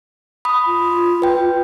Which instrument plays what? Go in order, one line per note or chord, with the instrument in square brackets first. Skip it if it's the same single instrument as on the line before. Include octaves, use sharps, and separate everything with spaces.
[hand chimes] B5 D#6
[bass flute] F4
[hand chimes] B4 G5